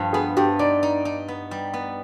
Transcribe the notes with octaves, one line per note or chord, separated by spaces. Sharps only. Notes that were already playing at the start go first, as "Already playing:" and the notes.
Already playing: G2 F3
B3 G#4
G2 G4
D#4 D5
D#4
D#4
B3
G3
B3